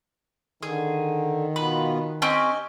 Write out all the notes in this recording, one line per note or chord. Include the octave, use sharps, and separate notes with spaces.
D3 D#3 G#4
B2 B3 F4 B4
C4 C#4 G4 D#5 G#5